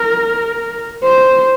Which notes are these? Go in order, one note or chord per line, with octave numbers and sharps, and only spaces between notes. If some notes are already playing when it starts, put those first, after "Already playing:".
Already playing: A#4
C5